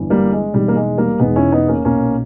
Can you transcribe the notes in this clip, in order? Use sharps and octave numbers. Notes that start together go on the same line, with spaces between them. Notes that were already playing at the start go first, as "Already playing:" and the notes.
Already playing: G1 G2 E3
G3 A#3
G#3
E1 E2 D#3 G3
A#3
G#3
G3 A#3
E1 E2 D#3 G#3 B3
C#4 E4
B3 D#4
A#3 C#4
B1 A#2 A#3 C#4